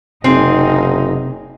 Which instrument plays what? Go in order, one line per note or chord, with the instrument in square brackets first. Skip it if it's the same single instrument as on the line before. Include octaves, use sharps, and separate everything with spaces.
[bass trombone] F#1 [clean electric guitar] C3 G#4 [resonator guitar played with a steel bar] C4 [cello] D#4